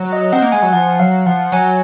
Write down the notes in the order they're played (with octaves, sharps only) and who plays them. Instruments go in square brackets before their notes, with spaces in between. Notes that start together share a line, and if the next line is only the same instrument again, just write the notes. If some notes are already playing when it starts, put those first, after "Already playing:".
Already playing: [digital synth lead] F#3
[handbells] D#5
[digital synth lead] C4 [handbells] F#5
[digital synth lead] A#3
[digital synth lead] G#3 [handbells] G#5
[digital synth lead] F#3
[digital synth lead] F3 [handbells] F#5
[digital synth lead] F#3 [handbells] F5
[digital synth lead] F3 [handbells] F#5
[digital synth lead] F#3 [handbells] G#5